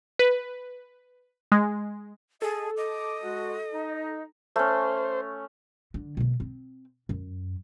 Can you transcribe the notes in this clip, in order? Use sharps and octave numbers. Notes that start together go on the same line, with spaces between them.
B4
G#3
G#4 A4 D#5
D#5 D6
G#3 F#4
D#4
A3 C#4 C5
D3
B2 A#3
C4
F#2